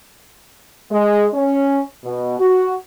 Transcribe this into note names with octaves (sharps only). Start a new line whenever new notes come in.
G#3
C#4
B2
F#4